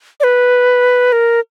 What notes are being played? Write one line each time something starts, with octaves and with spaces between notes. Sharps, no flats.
D5
B4
A#4